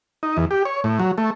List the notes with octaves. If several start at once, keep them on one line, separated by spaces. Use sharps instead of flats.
D#4
E2
G4
C#5
A2
F#3
A3